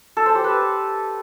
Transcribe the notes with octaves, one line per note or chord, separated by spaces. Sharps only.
A4
C5
G4
B4